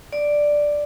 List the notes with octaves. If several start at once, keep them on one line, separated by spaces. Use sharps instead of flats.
D5